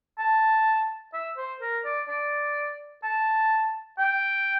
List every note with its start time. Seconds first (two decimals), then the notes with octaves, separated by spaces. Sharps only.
0.19 A5
1.14 E5
1.38 C5
1.62 A#4
1.85 D5
2.09 D5
3.04 A5
3.99 G5